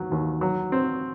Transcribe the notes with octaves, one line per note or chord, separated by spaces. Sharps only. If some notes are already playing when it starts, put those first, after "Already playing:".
Already playing: D#2 F#3
D#2
F#3
C4